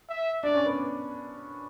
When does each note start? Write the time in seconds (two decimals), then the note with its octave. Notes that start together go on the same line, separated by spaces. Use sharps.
0.09 E5
0.43 D4 D5
0.55 C#4
0.66 B3